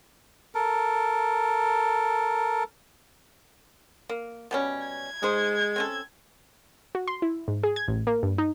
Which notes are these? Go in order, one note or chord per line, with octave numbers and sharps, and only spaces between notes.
A4 A#4
A#3
B2 G3 C#4
G#6
G#3 D#4 C5
C4 C#4 A4
F#4
C6
E4
G#2
G#4
G#6
A1
A#3
G2
D#4